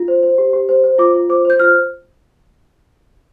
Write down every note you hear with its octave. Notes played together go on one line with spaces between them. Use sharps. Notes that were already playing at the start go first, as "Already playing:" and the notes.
Already playing: F4
C5
C5
G4
G4
C5
C5
F4 D6
F4
C5 D6
C5 G6
F4 F6